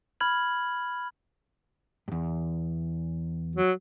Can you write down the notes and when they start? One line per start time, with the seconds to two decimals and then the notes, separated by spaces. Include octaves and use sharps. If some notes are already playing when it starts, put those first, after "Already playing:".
0.20 B5 F6 G#6 F#7
2.08 E2 G2
3.56 F#3